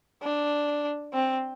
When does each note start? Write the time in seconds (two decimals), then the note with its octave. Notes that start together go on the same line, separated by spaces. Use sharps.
0.23 D4
1.14 C4